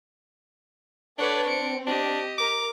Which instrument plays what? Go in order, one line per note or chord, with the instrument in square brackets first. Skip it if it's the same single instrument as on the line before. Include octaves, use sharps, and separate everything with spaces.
[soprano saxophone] D4 [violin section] A4 B4 C#5 [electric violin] D5 F#5
[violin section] C4 [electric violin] C#7 D7
[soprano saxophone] D4 [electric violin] G4 D#5
[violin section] A#4 [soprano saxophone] D6